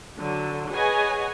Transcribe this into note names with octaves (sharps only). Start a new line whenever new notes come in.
D3 F#3
G#4 B4 C#5 D#5 F#5 G#5